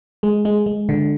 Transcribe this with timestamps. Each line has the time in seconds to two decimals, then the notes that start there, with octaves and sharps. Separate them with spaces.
0.23 G#3
0.45 G#3
0.66 G#3
0.89 D3